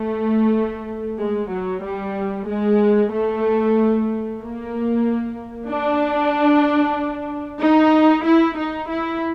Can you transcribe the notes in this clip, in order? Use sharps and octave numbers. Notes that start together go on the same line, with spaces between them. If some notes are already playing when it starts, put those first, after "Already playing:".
Already playing: A3
G#3
F#3
G3
G#3
A3
A#3
D4
D#4
E4
D#4
E4